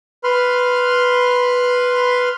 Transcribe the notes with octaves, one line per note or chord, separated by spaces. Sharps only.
B4 B5 C6 F6